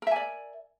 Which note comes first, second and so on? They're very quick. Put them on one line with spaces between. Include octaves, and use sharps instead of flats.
A#4 E5 G#5 D5